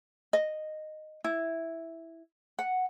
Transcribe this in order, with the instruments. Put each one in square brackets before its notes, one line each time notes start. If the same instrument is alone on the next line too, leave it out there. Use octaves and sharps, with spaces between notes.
[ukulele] D#5
E4
F#5